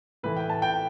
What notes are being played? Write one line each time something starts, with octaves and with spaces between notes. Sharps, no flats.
A2 E3 A3 E4 B4
G5
A5
G5